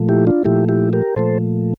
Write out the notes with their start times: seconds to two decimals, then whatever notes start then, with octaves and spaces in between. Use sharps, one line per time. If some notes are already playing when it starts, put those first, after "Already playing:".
Already playing: A#2 F3 A3
0.09 E4 G4
0.27 D4 F4
0.45 A#2 F3 A3 E4 G4
0.68 E4 G4
0.93 G4 A#4
1.16 A#2 F3 A3 A4 C5